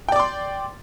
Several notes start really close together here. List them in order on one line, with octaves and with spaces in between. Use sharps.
G5 D5 D6 C6